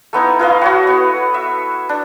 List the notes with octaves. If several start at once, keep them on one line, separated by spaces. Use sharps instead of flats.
A3 B3 D#4 E4
E4 B4 D#5 F5
F#4 C#5 F#5
B3
E5
D4